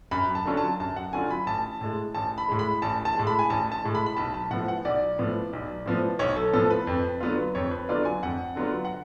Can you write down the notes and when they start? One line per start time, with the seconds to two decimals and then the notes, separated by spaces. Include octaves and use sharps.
0.11 F#2 B5
0.35 A5
0.45 D3 F#3 C#4 F4
0.57 A5
0.80 F#2 A5
0.96 F#5
1.13 D3 F#3 C#4 F4 G#5
1.31 B5
1.47 A1 A5
1.81 A2 G#3
2.15 A1 A5
2.38 B5
2.48 A2 G#3
2.59 B5
2.82 A1 A5
3.05 A5
3.16 A2 G#3
3.27 B5
3.39 G#5
3.50 A1 A5
3.72 A5
3.84 A2 G#3
3.95 B5
4.06 B5
4.17 B1 A5
4.34 A5
4.50 A2 F3 B3 F#5
4.68 F#5
4.85 B1 D5
5.19 A2 F3 B3
5.53 B1
5.86 A2 F3 B3
6.19 B1 C#5
6.36 A4
6.53 A2 F3 B3 A4
6.70 B4
6.87 F2
7.21 D3 F#3 B3 F4
7.55 F2 C#5
7.71 B4
7.89 D3 F#3 B3 F4 D5
8.05 G#5
8.23 F2 F#5
8.56 D3 F#3 B3 F4
8.85 F#5